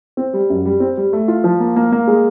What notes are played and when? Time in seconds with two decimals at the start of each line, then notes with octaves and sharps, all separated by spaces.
0.17 C4
0.33 G3
0.50 F#2
0.65 G3
0.80 C4
0.97 G3
1.13 A3
1.28 F4
1.44 F3
1.60 A#3
1.76 A#3
1.92 A#3
2.08 G#3